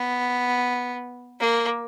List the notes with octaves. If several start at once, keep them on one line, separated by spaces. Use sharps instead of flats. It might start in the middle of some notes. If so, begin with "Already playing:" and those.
Already playing: B3
A#3